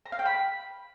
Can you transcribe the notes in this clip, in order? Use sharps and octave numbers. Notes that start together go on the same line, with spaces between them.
A#5
F5
G5
B5